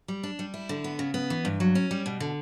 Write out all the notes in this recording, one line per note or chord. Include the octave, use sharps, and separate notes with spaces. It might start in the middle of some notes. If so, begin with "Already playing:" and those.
G3
D4
G3
E4
D3
B3
C#3
B3
E3
G2
F#3
C#4
G3
B2
D3